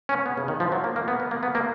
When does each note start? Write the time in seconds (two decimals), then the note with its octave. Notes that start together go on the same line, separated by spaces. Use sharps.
0.09 C#4
0.26 B3
0.37 C#3
0.48 D#3
0.60 F3
0.72 F#3
0.84 A#3
0.96 A#3
1.08 B3
1.20 B3
1.31 A#3
1.43 B3
1.55 A#3